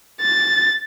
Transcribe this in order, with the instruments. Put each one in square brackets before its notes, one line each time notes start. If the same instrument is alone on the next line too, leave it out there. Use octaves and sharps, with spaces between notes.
[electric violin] A6